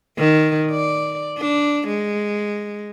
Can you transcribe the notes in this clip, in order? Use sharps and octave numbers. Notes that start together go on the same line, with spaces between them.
D#3
D5
D4
G#3